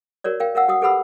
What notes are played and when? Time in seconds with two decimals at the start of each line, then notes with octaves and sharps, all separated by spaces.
0.24 F#4 A#4 C#5 D5
0.40 A#4 F5 G5
0.55 A#4 F5 F#5 E6
0.68 F#4 F#5 D#6
0.82 G4 A4 B4 F#5 B5 E6